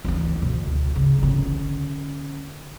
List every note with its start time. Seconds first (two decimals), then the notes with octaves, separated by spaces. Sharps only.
0.05 D2 E3
0.42 D2 B2
0.65 D2
0.96 C#3
1.19 D3 C#4